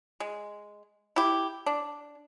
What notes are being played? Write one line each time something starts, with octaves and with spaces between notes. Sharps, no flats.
G#3
E4 G4
D4